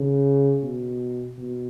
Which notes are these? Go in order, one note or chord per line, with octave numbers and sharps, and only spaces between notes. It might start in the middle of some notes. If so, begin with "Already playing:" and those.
Already playing: C#3
B2
B2